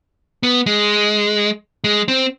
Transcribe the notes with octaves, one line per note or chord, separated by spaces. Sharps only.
B3
G#3
G#3
C4